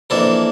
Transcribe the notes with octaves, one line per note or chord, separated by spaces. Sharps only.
F2 E3 A#3 D4 A4